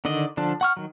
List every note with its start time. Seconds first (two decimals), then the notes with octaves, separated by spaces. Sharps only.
0.05 D3 D#3 D5 D#5
0.37 D3 F3 D4 A5
0.61 F#5 C#6 F6
0.77 D#3 F#3